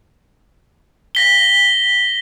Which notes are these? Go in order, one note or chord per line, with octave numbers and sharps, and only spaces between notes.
A#6 B6 G7